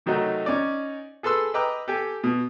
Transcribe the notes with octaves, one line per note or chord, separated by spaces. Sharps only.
C3 D#3 F#3 A3 D#4 F#4
C#4 D#4 D5
G#4 A4 B4 C6 E6
B4 D#5 G5 A#5 D6 E6
G4 A4 G5 G#5
B2